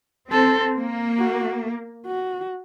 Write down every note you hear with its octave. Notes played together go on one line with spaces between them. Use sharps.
C4 A4
A#3
F#4
F#4